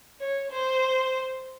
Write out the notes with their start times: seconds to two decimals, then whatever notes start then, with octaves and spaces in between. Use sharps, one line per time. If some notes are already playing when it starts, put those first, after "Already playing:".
0.20 C#5
0.50 C5